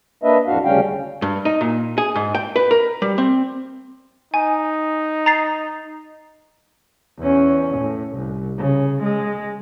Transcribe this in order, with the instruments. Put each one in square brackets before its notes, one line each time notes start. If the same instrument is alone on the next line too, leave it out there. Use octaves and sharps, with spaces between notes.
[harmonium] A#3 D4 B4 D#5 E5
F2 A2 D4 F#4 F5
D2 C#3 G3 C#4 F5 G5
[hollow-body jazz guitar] G2
D#4
A#2
G#4
G#2
G5
B4
A#4
G3
C4
[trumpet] D#4 [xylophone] G#5
[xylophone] A#5 A6 C7
[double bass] E2 C#4
A2
C2
C#3
G#3